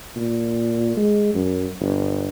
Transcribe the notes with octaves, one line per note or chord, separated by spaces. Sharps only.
A#2
G#3
F#2
G1